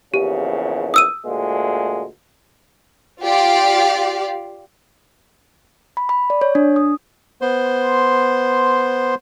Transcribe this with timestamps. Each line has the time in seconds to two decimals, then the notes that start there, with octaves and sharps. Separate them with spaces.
0.14 A#1 E2 C#3 G4
0.94 D#6 E6 D#7
1.25 D2 A#2 G#3
3.22 F4 G4 D5 F5
5.97 B5
6.09 B5
6.30 D5
6.41 C#5
6.55 D4
6.76 D#6
7.41 B3 C5 C6